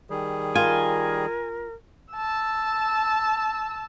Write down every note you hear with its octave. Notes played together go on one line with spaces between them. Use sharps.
D#3 G3 G#4
F4 A#4 G#5
A5 E6